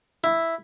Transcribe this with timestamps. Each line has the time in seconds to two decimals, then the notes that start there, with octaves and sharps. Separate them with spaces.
0.24 E4